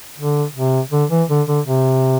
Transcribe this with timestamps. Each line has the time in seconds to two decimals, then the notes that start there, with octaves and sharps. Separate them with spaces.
0.18 D3
0.55 C3
0.92 D3
1.10 E3
1.29 D3
1.48 D3
1.66 C3